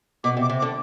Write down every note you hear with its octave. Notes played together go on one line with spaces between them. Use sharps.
B2 D6
C3
D6
C3
D6
D3